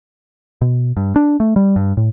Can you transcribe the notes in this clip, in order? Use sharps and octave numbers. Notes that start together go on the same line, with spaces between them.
B2
G2
D4
A3
G3
G2
A2